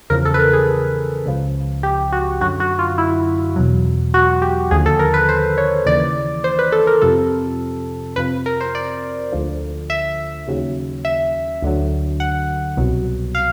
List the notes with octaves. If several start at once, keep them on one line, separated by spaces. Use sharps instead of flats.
E2 C#3 F3 A#4
A4
B4
A#4
G#4
C#2 C#3 F3
G4
F#4
F#2 D3 F#3 F#4
F#4
F4
E4
E2 B2 F#3
F#4
G4
D#2 D3 F3 G#4
A4
A#4
B4
C5
C#5
D#2 C#3 E3 D5
C5
B4
A4
A#4
F2 C3 F3 A4
F2 C3 F3 B4
A#4
C5
D5
D2 D3 F3
E5
D#2 C#3 F#3
E5
D2 D3 F#3
F#5
C2 B2 F#3
F5